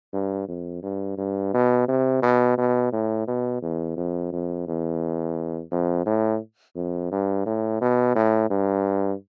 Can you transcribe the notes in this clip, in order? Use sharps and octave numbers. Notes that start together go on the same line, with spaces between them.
G2
F2
G2
G2
B2
C3
B2
B2
A2
B2
E2
F2
F2
E2
F2
A2
F2
G2
A2
B2
A2
G2